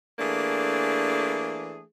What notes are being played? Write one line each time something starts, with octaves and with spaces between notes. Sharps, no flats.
E3 A3 A#3 D4 G#4